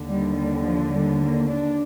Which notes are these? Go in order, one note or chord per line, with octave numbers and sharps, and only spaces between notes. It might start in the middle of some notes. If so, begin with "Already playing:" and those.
Already playing: D#2 D3
G3
G3
F3
G3
A#3
D4